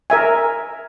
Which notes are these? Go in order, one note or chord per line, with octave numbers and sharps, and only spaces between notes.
A#4 E5 G#5